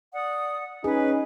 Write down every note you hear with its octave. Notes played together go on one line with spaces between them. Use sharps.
D5 F#5 D#6
C#4 D#4 G#4 B4